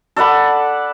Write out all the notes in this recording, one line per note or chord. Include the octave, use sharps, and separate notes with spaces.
A4 D5 F#5 B5